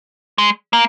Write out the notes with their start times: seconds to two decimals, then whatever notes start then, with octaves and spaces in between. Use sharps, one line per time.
0.38 G#3
0.73 A#3